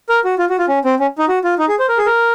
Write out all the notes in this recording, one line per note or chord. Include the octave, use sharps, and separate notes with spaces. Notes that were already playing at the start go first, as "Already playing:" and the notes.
A#4
F#4
F4
F#4
F4
C#4
C4
C#4
D#4
F#4
F4
D#4
G#4
C5
A#4
G#4
A#4